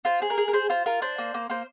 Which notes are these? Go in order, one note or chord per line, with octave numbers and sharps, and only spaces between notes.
F4 C5
G#4
A#4
G#4
A#4
G#4 C5
F4 C5
F4 A#4
D4 C5
A#3
A#3
A#3 C5